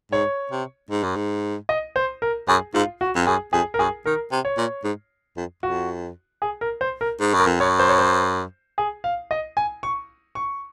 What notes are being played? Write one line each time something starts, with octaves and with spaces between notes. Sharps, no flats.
G#2 C#5
C3
G#2
F#2
G#2
D#5
C5
A#4
F#2 G#4
G#2 F4
F#4
F2
F#2 G#4
F2 G#4
A#4
F#2 G#4
D#3 A#4
C3
C#5
A#2
G#2
F2
F2 F#4
G#4
A#4
C5
A#4
G#2
F#2
A#4
F2
F#2 C#5
C5
C#5
C5
G#4
F5
D#5
G#5
C#6
C#6